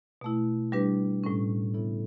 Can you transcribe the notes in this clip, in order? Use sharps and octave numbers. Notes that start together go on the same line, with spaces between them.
B2 A3 E4
G3 D4 G4 B4
A2 G3 C#4
C#3 E3 B3 E4 A4